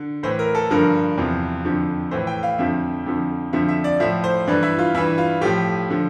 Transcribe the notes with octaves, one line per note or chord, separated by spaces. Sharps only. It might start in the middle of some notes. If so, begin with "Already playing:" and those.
Already playing: D3
A2 E3 C5
A#4
A4
G2 D3 F3 A#4
E2 C3 F3
F2 D3 F3
A2 E3 C5
G5
F5
F2 D3 F3 E5
F2 D3 F3
F2 D3 F3 E5
E5
D5
A2 F3 E5
C5
G2 E3 D4
E4
F4
G2 E3 E4
F4
A2 F3 G4
D3 F3